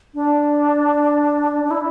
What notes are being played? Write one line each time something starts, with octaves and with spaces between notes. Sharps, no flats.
D4
D4
E4